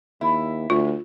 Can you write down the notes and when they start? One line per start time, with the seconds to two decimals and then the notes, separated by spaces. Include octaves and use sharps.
0.21 D#2 E4
0.70 D2 F4